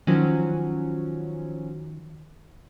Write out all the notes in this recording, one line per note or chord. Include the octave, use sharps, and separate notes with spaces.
D#3 F3 F#3 C#4